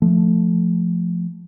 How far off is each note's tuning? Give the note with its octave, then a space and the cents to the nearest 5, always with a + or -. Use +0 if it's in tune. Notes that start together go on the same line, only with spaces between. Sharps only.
F3 +0 A3 +0